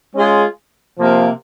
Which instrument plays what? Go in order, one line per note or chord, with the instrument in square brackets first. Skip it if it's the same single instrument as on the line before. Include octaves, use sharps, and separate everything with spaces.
[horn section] G#3 C#4 F4 G#4
C3 F3 A#3